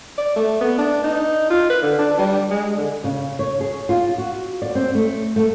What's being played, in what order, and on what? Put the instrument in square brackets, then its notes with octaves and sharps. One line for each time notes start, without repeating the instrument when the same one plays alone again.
[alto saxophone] D5
A3
B3
D4
D#4
F4
B4
D3
D4
G3
G#3
D3
[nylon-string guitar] C#3
C#5
G#4
F4
F#4
D5
C4
A3
A3